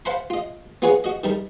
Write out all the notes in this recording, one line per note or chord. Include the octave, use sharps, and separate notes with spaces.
C5 F5 F#5 A5 B5 C6
F4 D#5
B3 F4 G#4 C#5 F#5
F#4 D#5
D#3 G3 A#4